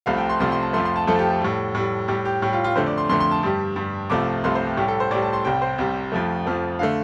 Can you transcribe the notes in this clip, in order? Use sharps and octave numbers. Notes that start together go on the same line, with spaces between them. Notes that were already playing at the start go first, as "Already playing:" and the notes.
C2 C3 F3 A3 F5
G5
C6
C2 C3 F3 A3 C6
C6
A5
F2 F3 A3 C6
C6
A5
F2 F3 A3 A4
G4
A4
A2 G3
A2 G3
A2 G3 G4
G4
A2 G3 G4
F4
F4
F2 D3 A3 C5
D5
C6
F2 D3 A3 C6
C6
A5
G2 G3
G2 G3
C2 C3 F3 A3 D6
C2 C3 F3 A3 C6
C5
G4
A2 G3 G4
A4
C5
A2 G3 D5
A5
C6
C2 C3 G3 G5
C5
C2 C3 G3
F2 F3 A3
F2 F3 A3
D3 A3 F5